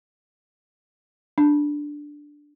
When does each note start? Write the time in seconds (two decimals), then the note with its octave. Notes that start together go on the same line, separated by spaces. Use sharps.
1.38 D4